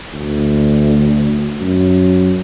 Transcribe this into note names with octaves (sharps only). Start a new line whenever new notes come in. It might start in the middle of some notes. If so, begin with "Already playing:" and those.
D2
F#2